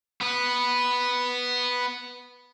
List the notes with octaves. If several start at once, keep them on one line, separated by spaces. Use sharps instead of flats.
B3 B4